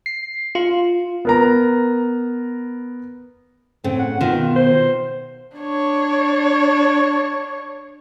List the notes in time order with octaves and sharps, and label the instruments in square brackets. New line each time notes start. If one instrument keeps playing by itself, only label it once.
[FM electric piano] C7
F4
[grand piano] B3 A#4 A#5
[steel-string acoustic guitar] A2 C#3 [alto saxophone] C4
[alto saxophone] F#5
[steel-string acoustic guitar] B2 D#3 [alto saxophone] F4
[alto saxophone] C5
[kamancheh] D4 C#5